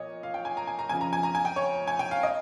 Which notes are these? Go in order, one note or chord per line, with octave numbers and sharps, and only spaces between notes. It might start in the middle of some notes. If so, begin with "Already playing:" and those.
Already playing: A#2 F3 C#5 D#5
F5
G5
G#5
A#5
G#5
A#5
F2 C#3 F3 G#5
A#5
G#5
A#5
G#5
G5
C#5
G#5
G5
F5
D#5